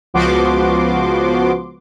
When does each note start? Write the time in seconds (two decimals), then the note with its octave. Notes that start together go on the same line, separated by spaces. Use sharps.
0.14 C#2 F3 B3 F#4 C6 D6